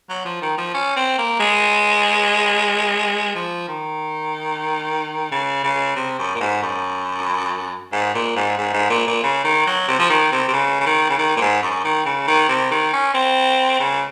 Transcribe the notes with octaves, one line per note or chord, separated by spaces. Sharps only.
F#3
F3
D#3
F3
C#4
C4
A#3
G#3
F3
D#3
C#3
C#3
C3
F#2
A#2
G#2
F#2
G#2
A#2
G#2
G#2
G#2
A#2
A#2
C#3
D#3
F#3
C3
F3
D#3
C3
C3
C#3
C#3
D#3
C#3
D#3
A#2
G#2
F#2
D#3
C#3
D#3
C3
D#3
C#4
C4
C#3